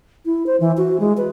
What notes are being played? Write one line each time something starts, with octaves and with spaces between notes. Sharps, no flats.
E4
C5
E3
F#4
G#3
B4